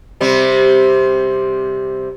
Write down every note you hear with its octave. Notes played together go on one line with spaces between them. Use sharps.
C3 G3 C4